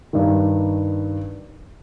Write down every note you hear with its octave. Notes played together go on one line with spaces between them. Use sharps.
G2 D#3